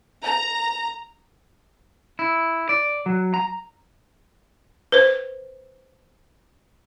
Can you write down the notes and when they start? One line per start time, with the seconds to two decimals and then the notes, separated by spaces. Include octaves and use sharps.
0.23 A#5
2.19 E4
2.69 D5
3.06 F#3
3.34 A#5
4.92 B4 C5